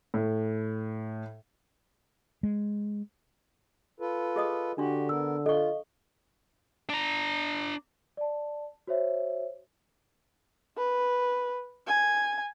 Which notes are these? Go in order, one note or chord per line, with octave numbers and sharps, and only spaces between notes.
A2
G#3
F4 A4 B4
G#4 D#5 D#6
D3 D4 F#4 G4 C6
B3 A#4 E6
F4 A4 D#5 F5 C#6
D4 A#5
D5 A5
F#4 C5 C#5 E5
B4
G#5